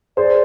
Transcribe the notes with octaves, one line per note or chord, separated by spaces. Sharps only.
G#4 C5 D5